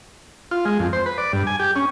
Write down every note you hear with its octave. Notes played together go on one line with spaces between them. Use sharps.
F4
G#3
F2
C5
B4
D5
G2
G#5
G4
C#4